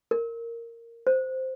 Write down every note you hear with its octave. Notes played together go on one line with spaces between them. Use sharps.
A#4
C5